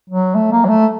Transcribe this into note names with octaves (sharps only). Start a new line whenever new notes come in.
F#3
A3
A#3
F#3
A3